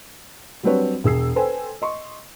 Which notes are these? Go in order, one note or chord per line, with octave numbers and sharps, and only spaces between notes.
F#3 G3 C4 D4 B4 C#5
E1 G#4 E6 C7
A4 B4 C5 G5 G#5
D#5 C6 C#6